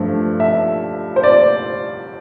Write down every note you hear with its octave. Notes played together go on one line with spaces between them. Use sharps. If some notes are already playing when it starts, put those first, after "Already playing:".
Already playing: G2 F3 A3
E5
C5
D5